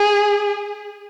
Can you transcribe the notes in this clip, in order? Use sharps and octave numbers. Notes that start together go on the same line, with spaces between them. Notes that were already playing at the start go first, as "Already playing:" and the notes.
Already playing: G#4